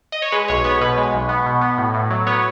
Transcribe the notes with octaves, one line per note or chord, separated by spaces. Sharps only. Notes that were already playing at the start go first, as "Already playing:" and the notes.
D#5
C#5
G#3 B4
B1 C#5
B3 C#5
B2 B4
G#3
B1
B3
B2
B3
A2
A2
F#3
B3 C#5